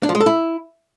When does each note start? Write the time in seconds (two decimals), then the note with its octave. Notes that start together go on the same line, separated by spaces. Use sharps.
0.03 D4
0.09 F3
0.15 G#3
0.20 A4
0.26 E4